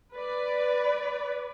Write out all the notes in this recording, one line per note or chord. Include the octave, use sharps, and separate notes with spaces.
B4 D5